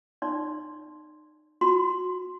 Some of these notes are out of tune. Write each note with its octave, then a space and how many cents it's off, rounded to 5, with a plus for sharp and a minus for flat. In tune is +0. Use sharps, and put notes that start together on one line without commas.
D#4 -30 D5 +0 C6 +0
F#4 -25 C6 +0